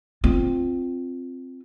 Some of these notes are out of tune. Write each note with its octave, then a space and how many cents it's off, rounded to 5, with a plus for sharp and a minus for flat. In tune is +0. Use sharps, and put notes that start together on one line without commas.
C4 +0 F4 +0